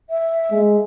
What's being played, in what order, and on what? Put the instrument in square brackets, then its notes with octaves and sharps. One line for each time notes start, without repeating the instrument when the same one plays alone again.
[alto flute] E5
[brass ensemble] G#3